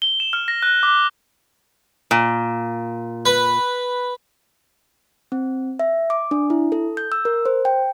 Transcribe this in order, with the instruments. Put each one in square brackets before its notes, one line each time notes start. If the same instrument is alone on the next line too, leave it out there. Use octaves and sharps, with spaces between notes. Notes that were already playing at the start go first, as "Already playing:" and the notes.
[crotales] G7
E7
F6
A#6
F#6
D6
[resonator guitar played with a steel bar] A#2
[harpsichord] B4
[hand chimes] C4
E5
D6
D4
E4
A4
G6
E6
A#4
C5
G5